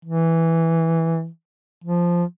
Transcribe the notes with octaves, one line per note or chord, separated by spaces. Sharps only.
E3
F3